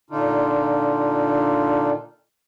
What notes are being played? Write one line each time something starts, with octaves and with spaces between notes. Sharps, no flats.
A#2 D3 D4 D#4 F4